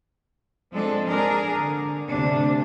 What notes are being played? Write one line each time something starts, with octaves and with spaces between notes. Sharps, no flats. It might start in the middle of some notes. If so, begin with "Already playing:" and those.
F3 G#3 C4 D4 A4
D4 G#4 A#4
D3
D2 C3 D4